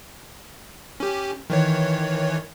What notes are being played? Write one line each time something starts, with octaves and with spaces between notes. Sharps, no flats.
C#4 G4
D#3 E3 C#5